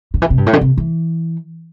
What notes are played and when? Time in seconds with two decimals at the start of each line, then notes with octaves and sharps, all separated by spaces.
0.14 D3
0.22 E3
0.30 C3
0.38 G2
0.46 A2
0.53 D3
0.61 C3
0.78 E3